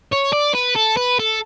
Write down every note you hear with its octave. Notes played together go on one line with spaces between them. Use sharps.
C#5
D5
B4
A4
B4
A4